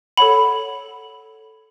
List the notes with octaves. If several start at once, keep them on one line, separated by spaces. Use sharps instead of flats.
A4 C#5 F#5 B5